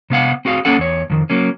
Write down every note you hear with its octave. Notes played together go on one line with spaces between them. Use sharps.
C3 B3 F5 F#5
C4 F#4 G#4 F5
A#3 C#4 A4 F#5
E2 C#5
F2 D#3
F#3 A#3 C#4